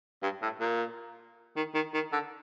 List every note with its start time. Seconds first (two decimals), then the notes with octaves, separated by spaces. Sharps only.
0.23 G2
0.42 A2
0.60 A#2
1.56 D#3
1.75 D#3
1.94 D#3
2.12 D3